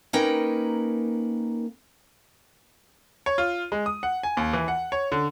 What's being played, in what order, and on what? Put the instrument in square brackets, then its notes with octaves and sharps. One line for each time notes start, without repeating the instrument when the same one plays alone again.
[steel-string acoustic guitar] A#3 C#4 D#4 A#4 B4 G5
[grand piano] C#5
F4
G#3
D#6
F#5
G#5
D#2
E3
F#5
C#5
D3